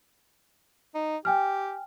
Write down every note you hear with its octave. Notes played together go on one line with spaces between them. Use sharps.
D#4
G4 G5 G#5 F6